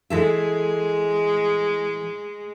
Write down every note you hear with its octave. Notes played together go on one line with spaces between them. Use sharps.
E3 G#3 A4 E5